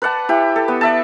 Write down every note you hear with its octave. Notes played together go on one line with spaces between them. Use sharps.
B4 D5 F#5 A5
E4 G4
A4
B3
D5 E5 A5